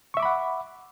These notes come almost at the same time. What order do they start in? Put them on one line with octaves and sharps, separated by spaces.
C#6 E5 D6 B5 F#5